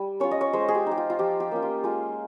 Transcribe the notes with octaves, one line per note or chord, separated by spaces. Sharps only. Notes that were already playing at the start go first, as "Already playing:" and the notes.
Already playing: G3
C#4 F4 C#5
D#5
C#5
G#3 C5
G#4
G4
D#4
G4
F4
F4
F3 G4
G4
A#3 C#4 F4
F4
G#3 F4